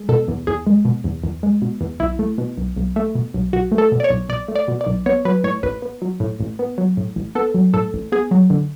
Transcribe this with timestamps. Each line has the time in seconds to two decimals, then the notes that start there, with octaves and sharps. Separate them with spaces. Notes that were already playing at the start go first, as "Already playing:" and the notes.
Already playing: G#3
0.09 B2 A4
0.28 E2
0.47 E2 G#4
0.67 G#3
0.85 B2
1.04 E2
1.24 E2
1.43 G#3
1.62 B2
1.81 E2
2.00 B1 E4
2.19 A3
2.38 B2
2.58 B1
2.77 B1
2.96 A3
3.15 B2
3.34 B1
3.53 B1 F#4
3.72 A3
3.78 A4
3.92 B2
4.00 D5
4.04 C#5
4.10 B1
4.29 B1 D5
4.48 A3
4.55 D5
4.68 B2
4.81 D5
4.87 B1
5.06 B3 C#5
5.25 F#3 B4
5.44 A2 C#5
5.63 A1 B4
5.82 B3
6.02 F#3
6.20 A2
6.40 A1
6.59 B3
6.78 F#3
6.97 A2
7.16 A1
7.35 B3 A4
7.54 F#3
7.74 A2 A4
7.93 A1
8.12 B3 G#4
8.31 F#3
8.50 D3